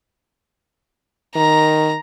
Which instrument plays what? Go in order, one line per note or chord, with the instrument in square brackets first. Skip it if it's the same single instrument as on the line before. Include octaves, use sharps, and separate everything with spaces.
[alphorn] D#3 [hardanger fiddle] A#5